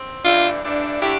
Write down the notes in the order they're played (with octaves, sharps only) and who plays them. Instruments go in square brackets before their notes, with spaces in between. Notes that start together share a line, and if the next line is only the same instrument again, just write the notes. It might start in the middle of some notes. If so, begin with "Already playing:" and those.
Already playing: [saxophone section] C4
[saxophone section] G2 E3 A3 D4 [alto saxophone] F4
[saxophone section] G2 E3 A3 D4
[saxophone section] D3 A3 D4 G4 [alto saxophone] E4